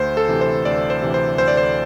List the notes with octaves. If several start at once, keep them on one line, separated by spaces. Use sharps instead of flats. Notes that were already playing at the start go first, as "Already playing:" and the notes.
Already playing: D2 C5
A4
C3 E3
C5
D2 D5
C5
C3 E3
C5
D2 C5
D5
C5